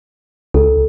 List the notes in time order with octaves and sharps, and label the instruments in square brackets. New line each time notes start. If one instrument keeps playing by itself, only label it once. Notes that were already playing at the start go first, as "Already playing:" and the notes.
[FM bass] C#2 [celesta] A4